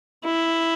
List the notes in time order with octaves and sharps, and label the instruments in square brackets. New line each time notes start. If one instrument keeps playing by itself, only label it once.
[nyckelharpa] E4